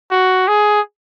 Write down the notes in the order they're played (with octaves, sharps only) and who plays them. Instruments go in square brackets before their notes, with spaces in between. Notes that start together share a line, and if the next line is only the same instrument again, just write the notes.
[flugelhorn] F#4
G#4